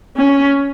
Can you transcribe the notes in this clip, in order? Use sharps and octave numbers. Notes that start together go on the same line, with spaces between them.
C#4